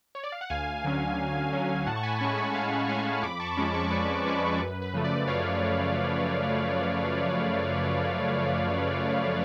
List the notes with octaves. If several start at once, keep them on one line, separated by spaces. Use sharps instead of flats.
C#5
D5
F5
F#5
D2 F5 G#5
D3 F#3 C#4
D2
D3 F#3 C#4
A2 F#5 A5
C#6
G#5 B5
G#3 C#4 A5 C#6
G#5 B5
A2 F5 G#5
G#3 C#4 F5 G#5
F2 B5 D6
A5 C#6
F3 G#3 C#4 B5 D6
A5 C#6
F2 B4 D5
F3 G#3 C#4 B4 D5
F#2 B4
B4
C#3 F3 A3
B4 D5
F#2 C#5 F5